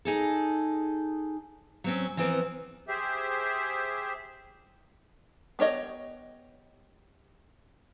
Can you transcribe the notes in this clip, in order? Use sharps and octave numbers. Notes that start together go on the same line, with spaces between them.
D#4 G#4 A4
F#3 C4 C#4
E3 F3 B3 C4 A#4
G4 G#4 C5 E5
B3 G4 C#5 D#5